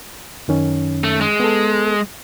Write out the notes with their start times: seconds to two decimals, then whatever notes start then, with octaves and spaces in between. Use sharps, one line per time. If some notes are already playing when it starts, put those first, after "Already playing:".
0.48 F#2 D#3 C#4
1.04 A3
1.21 G#3
1.40 B3 A4